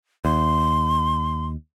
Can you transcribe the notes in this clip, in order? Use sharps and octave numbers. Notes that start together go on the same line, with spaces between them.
D#2 C6